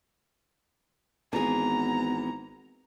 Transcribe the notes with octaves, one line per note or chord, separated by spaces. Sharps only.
G#1 E3 B3 G#4 A#5